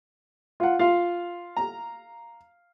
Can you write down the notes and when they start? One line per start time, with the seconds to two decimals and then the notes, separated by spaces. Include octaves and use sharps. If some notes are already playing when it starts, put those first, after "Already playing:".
0.60 F4 F#5
0.79 F4 F5
1.57 A#5